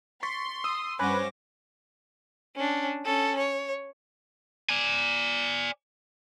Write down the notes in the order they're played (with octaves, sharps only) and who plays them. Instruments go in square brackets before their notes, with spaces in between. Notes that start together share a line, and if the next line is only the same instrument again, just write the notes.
[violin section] C6 [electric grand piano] C#6 A6 B6
[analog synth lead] D#6 [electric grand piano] E6
[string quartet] G2 D6 A#6 [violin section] C#4 C5 [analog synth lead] B4 [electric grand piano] F#5 G#5
[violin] C#4 D4
C#4 A4
C#5
[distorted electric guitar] D5 G#5